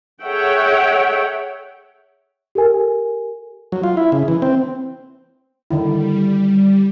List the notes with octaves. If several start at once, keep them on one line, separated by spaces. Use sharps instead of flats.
G#4 A4 C#5 E5 F#5 G5
G4 A4 A#4 G#5
F#3
F4
E4
C#3
E3
C4
D3 D#3 G3 E4